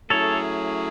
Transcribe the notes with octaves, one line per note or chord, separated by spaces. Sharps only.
F#3 A3 C#4 E4 G#4 A4 C#5